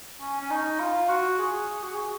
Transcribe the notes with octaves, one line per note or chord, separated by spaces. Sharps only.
C#4
C#4
D#4
F4
F#4
G#4
F#4
G#4